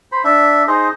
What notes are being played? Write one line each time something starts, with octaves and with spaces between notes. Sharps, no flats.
C5 B5
D4 E5
D#4 G#4 C5 D#5